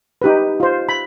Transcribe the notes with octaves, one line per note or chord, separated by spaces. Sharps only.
D#4 G4 B4
F4 C5
B5